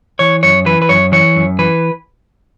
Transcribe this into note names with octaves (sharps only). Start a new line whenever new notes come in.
E3 C#5
F#2 C#5
E3 B4
B4
F#2 C#5
E3 C#5
F#2
E3 B4